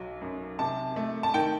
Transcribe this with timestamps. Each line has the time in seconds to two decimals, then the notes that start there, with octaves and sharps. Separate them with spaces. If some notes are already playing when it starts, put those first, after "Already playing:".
Already playing: B1 F#3
0.21 F#2
0.59 C3 A5
0.96 A3
1.23 A5
1.34 D#3 G5